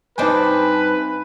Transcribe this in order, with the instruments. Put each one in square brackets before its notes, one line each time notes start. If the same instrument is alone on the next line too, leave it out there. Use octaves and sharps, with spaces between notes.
[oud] G2 C4 D4 [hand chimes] D#4 D#5 G#5 [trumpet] B4